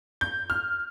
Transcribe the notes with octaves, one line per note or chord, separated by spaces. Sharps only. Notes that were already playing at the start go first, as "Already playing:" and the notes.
G6
F6